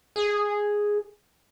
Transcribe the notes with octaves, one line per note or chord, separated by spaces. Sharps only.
G#4